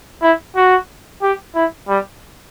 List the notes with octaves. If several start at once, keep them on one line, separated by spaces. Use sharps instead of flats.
E4
F#4
G4
E4
G3